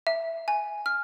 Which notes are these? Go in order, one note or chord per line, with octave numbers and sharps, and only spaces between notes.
E5
G#5
F6